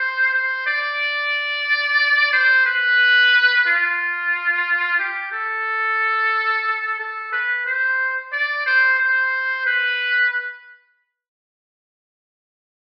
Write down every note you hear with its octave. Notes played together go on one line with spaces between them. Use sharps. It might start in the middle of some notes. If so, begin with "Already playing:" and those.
Already playing: C5
C5
D5
C5
B4
F4
G4
A4
A4
B4
C5
D5
C5
C5
B4